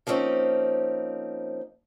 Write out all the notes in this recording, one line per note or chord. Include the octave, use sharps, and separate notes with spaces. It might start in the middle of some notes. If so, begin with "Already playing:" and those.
F3 A#3 C4 C#4 D#4